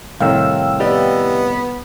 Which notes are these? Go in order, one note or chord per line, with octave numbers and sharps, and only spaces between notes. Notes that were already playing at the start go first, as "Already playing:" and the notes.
C2 A2 D#3 F5 G5 E6
B3 G4 D5 D#5